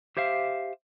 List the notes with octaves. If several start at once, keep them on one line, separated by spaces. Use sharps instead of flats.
G4 C5 E5 F5